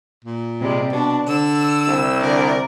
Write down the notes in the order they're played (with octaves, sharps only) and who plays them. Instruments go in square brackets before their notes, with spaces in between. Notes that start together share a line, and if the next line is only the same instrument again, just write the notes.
[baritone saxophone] A#2
[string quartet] C3 G3 G#3
[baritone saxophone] B2 [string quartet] D4
[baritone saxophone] D3 [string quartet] E6
[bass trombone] C2
[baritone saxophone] D3 [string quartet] A#4 D5